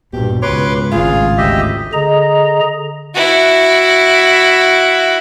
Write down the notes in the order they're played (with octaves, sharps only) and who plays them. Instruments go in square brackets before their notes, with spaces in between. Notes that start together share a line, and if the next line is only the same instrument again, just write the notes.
[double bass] A#1 G2 [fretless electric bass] B2 [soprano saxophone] G4
[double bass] C#2 G#2 [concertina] B4 C6 D6 [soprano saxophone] C#5
[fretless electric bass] G#1 A2 [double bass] C#3 [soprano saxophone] F4 [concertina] G#4
[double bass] D2 C#3 [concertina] G4 D#5 E5
[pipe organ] D3 G#4 D#5 A#5
[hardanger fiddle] E4 F#4